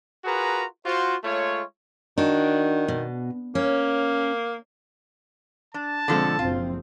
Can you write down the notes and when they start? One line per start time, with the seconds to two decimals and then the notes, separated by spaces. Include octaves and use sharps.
0.25 F4 F#4 G#4 A#4 B4 A#5
0.85 F4 F#4 C5
1.24 G#3 A3 F4 C#5
2.18 D#3 D4 F#4
2.88 B2
3.55 A#3 C#4
5.74 D4 A5
6.08 B2 D3 F3 G#3 C4 A4
6.39 F#1 F3 C4 F4